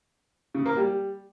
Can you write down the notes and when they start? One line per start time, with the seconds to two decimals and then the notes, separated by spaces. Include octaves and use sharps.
0.54 C#3
0.66 A#3
0.77 G3